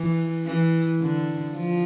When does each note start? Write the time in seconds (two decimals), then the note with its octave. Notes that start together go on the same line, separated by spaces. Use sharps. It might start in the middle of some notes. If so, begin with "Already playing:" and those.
Already playing: E3
0.45 E3
1.00 D3
1.55 F3